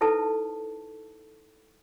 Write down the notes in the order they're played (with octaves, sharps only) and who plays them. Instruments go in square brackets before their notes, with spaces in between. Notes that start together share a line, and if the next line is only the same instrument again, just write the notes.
[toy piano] D#4 E4 A4 B4 C5 A5